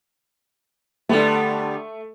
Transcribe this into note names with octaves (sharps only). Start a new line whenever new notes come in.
D3 G3 A3 B3